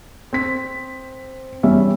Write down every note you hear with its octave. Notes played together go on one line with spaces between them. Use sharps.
C4 B6
E2 G3 C#4 E5